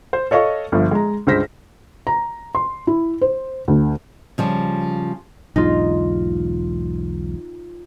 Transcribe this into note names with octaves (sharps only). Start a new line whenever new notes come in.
C5
A4 C#5 D#5 F5 C#6
G1 F3
G#3 A#5
C#2 G2 C5 A#6 B6
A#5
C6
E4
C5
D2
C#3 F3 G3
B1 E2 G#2 D#4 F4